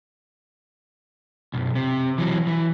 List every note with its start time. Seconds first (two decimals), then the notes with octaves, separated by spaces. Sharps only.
1.54 B1 F#2
1.75 C3
2.18 E3 F#3
2.47 E3